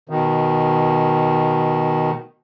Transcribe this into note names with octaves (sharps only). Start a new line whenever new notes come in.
B2 D#3